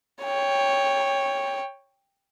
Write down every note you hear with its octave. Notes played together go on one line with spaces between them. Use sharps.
C#5 G5